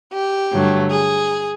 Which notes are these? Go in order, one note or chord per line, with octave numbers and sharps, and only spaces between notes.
G4
G2 D3 F#3 A3
G#4